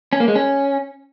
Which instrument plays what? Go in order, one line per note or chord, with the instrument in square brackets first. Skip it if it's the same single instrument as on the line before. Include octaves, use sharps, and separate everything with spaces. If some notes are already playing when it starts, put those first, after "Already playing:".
[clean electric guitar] C#4
A#3
G#3
C#4